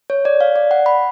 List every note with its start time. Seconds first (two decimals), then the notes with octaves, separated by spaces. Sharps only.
0.10 C#5
0.25 D5
0.41 F5
0.56 D5
0.71 F#5
0.86 B5